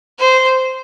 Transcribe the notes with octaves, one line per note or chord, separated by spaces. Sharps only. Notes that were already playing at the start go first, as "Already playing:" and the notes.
C5